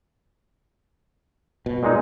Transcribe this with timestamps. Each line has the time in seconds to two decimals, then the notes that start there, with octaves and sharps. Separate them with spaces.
1.66 B2
1.83 A#2 G#3 D#4